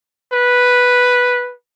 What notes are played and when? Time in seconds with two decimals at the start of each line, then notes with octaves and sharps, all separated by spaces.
0.32 B4